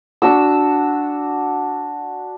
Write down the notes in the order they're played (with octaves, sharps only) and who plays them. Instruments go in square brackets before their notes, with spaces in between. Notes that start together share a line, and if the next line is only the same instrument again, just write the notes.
[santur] D4 F#4 E6